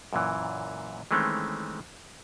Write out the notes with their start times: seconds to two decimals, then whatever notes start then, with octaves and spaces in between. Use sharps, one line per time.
0.13 F#2 A#2 E3
1.11 D#3 E3 G#3 A3 C4 C#4